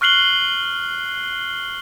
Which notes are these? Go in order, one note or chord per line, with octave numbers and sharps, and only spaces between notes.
C#6 F6 F#6 C7 F#7 G7